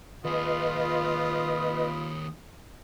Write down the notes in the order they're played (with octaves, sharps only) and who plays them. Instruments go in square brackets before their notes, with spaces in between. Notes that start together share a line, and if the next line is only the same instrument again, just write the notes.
[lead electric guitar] D#2 G#4 [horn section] F4 [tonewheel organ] B4 D#5 [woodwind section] B5 D#6